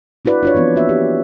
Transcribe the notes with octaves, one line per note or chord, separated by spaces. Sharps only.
D4 E4 F#4 B4 D5
D4 F4 C#5
E3 F3 B3 C4
A#3 F#4 E5
G4